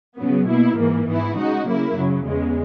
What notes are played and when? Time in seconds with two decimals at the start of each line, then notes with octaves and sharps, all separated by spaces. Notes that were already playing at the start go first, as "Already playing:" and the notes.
0.17 C#3 F#3 B3
0.47 B2 A#3 E4
0.77 G#2 E3 A#3
1.07 G#2 E3 B3 E4
1.36 C#3 G#3 D#4 F#4
1.66 C#3 F#3 A#3 E4
1.96 F#2 C#3 F#3
2.26 E2 C#3 G#3